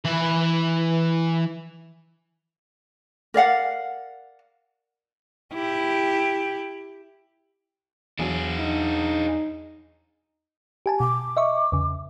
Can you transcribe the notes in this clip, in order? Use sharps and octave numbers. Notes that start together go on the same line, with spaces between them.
E3 B5
A#4 D5 F5 F#5
E4 G4
E2 F#3 D4 G#4
D#4
G4 G#5 A5
B2 D6
D#5 E5 C#6
E2 C#3